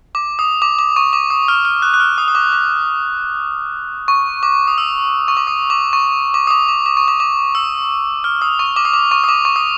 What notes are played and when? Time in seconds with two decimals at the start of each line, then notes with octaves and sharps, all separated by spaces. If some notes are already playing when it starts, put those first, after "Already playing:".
0.15 D6
0.39 D#6
0.62 D6
0.79 D6
0.96 C#6
1.13 D6
1.30 D#6
1.48 F6
1.65 F6
1.82 F#6
1.94 F#6
2.00 F6
2.18 D#6
2.28 D#6
2.35 D6
2.52 D6
4.08 C#6
4.43 D6
4.68 D#6
4.78 E6
5.28 C#6
5.37 D6
5.47 D#6
5.70 D6
5.93 C#6
6.34 D6
6.47 D#6
6.51 D6
6.68 D6
6.86 D6
6.97 C#6
7.08 D6
7.20 D6
7.55 E6
8.24 F6
8.42 D#6
8.59 C#6
8.76 D6
8.85 D#6
8.94 D6
9.11 C#6
9.24 D#6
9.28 D6
9.45 C#6
9.56 D#6